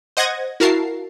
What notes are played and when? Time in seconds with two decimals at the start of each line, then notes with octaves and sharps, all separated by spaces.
0.17 C5 D#5 F#5 D#6 G#6 A#6
0.60 E4 F#4 A#4 F5 A5 C7